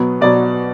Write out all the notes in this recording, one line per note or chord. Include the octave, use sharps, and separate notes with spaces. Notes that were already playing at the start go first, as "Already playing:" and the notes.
Already playing: B2 F#3 B3
B2 F#3 B3 D5